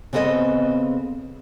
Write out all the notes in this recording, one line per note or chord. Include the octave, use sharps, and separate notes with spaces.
C#3 B3 C4 A4 D#5